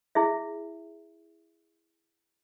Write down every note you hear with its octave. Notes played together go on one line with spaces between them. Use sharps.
E4 G#4 E5